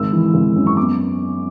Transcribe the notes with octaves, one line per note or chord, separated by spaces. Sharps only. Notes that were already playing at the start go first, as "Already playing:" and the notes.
Already playing: G#1 E6
E3
G#1
F#2
C#6
B3 D6